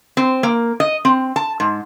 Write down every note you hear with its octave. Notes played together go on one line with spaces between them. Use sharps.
C4
A#3
D#5
C4
A5
G#2